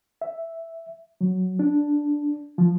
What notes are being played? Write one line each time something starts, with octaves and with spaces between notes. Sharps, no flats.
E5
F#3
D4
F3